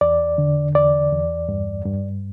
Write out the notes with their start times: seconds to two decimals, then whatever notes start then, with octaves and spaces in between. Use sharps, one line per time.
0.01 E2 D5
0.38 D3
0.75 E2 D5
1.12 E2
1.49 G2
1.85 G2